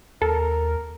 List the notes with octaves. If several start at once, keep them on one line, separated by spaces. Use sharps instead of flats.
D#2 A4 A#4